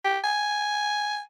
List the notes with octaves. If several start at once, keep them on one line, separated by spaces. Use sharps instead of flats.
G4
G#5